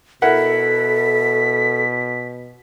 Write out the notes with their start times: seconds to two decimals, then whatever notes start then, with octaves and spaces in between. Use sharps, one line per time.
0.22 B2 E4 A4 A#4 F#5 B6